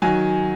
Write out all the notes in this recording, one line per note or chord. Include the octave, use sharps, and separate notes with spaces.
D#3 F#3 G#5